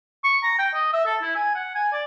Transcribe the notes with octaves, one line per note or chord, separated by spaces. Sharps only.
C#6
A#5
G5
D#5
E5
A4
E4
G#5
F#5
G#5
D5